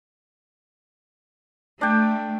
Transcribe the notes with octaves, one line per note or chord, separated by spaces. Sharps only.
A3 D4 G5